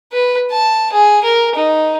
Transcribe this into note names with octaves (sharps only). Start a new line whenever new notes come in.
B4
A5
G#4
A#4
D#4